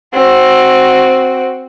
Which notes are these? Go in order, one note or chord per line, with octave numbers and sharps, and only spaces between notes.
C4 F#4